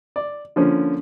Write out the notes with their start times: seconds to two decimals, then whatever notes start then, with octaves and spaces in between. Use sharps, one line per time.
0.16 D5
0.56 D3 F3 A#3 C#4